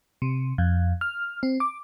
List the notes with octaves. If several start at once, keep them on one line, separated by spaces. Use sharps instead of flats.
C3
F2
F6
C4
D6